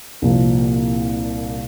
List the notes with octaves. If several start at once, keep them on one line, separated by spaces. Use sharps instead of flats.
C2 A#2 F3